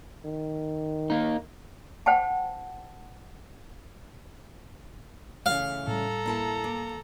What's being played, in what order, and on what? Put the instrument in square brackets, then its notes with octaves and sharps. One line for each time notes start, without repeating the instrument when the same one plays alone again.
[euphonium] D#3
[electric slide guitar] A#3 D#4
[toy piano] C5 F#5 G5 A5
[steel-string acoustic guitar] C#3 E3 A3 [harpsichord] F5
[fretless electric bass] A2 G3 [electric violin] A4 A#5
[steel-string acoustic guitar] A#3 E4 A5
A#3